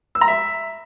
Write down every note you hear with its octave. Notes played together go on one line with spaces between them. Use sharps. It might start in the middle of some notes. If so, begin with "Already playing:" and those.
E6
A#5
E5